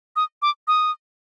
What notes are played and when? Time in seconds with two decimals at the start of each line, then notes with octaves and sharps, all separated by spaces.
0.16 D#6
0.42 D6
0.68 D#6